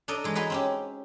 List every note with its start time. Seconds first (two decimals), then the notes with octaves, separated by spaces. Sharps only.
0.08 D4 D#4 A4 D5 D#5
0.24 E3 G#3
0.35 D#4 F#4 G#4 B4
0.50 C4 C#4 G4